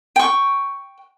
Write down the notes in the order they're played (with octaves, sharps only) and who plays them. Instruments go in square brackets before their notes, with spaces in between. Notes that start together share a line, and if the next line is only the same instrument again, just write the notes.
[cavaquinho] G5 C#6